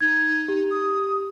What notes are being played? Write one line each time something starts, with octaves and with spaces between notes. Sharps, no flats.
D#4 G#6
G4
D#6